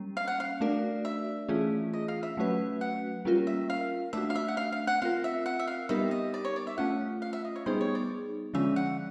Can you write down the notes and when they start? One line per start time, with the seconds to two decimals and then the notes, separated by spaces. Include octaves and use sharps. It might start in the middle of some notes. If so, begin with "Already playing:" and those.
Already playing: G3 A#3 C#4
0.17 F5
0.28 F#5
0.40 F5
0.61 A3 D4 F#4 A#4 D5
1.05 E5
1.49 E3 A3 C#4 F4 G#4
1.94 D#5
2.08 F5
2.23 E5
2.37 F#3 A3 C#4 F#4 B4
2.81 F#5
3.25 G3 A#3 C#4 F4 A#4
3.47 E5
3.70 F5
4.13 A3 D4 F#4 E5
4.30 F5
4.36 E5
4.48 F#5
4.57 F5
4.72 F5
4.87 F#5
5.02 C4 F4 A#4 F5
5.24 E5
5.46 F#5
5.59 E5
5.67 F5
5.89 G3 B3 D#4 G4 A#4 E5
6.11 D#5
6.34 D5
6.45 C#5
6.56 D5
6.67 E5
6.78 A3 C#4 F4 F#5
7.22 F5
7.33 E5
7.45 D#5
7.56 C#5
7.66 G3 B3 D#4 G#4 C5
7.81 C#5
7.95 D5
8.54 D3 F3 G#3 C#4 E5
8.76 F#5